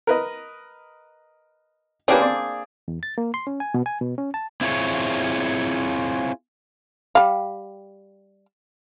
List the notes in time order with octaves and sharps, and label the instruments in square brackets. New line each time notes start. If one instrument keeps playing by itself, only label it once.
[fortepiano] A#4 B4 D#5
[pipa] A#3 D4 G#4 [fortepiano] C#4 G4 B4
[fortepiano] C4 D5
[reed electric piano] E2
A6
A#3
C6
C#4
G#5
B2
G#5
B2
C#4
A5
[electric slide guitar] C4 E4 F4 G#4 C#5
[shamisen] G3 F5